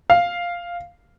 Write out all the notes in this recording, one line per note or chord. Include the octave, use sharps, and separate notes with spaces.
F5